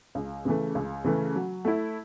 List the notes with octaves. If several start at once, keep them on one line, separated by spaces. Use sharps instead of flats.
C#2
C#3 E3 A3
C#2
C#3 E3 A3
F#3
A3 E4